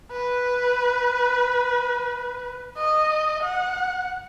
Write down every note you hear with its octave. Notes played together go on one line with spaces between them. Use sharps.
B4
D#5
F#5